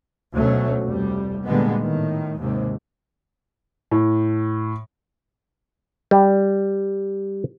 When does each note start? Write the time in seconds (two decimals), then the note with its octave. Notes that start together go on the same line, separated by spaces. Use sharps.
0.34 D2 B2 F#3 A3 C#4
0.83 F1 G3
1.45 A#2 D3 G3 G#3 B3
1.81 A2 D#3
2.40 D#2 G#2 C3
3.91 A2
6.11 G3